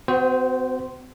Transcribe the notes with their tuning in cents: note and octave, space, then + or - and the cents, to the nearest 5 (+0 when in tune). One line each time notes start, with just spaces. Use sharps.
C4 -45 F#4 +0 C5 -10